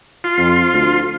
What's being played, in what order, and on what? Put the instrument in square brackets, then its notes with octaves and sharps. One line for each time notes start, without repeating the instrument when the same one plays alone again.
[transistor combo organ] F4 C6
[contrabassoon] F2
D2